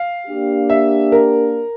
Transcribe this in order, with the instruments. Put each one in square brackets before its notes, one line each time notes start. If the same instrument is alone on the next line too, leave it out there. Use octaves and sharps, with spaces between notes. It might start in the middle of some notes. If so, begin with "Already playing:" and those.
Already playing: [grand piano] F5
[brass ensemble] A#3 D4 G4
[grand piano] E5
A#4